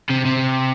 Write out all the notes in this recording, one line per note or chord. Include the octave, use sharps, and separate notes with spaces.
C3
C3